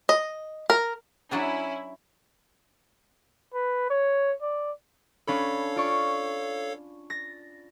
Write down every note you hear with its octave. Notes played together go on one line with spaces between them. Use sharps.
D#5
A#4
F#3 C#4 D4 E4 G#4
B4
C#5
D5
C#4 D4 A4 C#5 F5 B5
F4 D5 C#6
A6 A#6